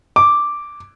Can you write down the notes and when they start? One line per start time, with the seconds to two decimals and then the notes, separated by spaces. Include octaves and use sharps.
0.16 D6